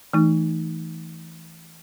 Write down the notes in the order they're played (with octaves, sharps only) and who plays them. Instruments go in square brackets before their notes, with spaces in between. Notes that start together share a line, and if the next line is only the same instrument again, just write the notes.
[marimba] E3 A3 D#4